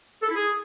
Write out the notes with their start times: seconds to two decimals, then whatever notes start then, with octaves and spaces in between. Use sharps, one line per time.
0.22 A4
0.28 E4
0.35 G#4